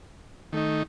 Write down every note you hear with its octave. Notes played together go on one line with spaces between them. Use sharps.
D#3 A3 D#4